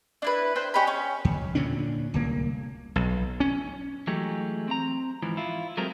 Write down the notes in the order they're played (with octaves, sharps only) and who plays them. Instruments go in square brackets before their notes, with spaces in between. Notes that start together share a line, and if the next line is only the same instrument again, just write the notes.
[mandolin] D4 E4 B4
B4 C5 G5
C#4 G4 D#5 B5
C#4
[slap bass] D#2
A#2 D3 C#4 D4
D1 C2 A#3
B1
C#4
[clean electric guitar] E3 F#3 G#3 A3 G4
C4 A#5
G#2 E3 F3
E4 F4
F#3 G#3 A3 C4 A#4